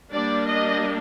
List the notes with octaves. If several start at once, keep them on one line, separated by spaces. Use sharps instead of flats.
G3 A#3 D4 D5
D#5